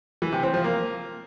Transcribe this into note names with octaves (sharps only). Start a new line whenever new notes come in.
E3
C3
C4
F3
A#3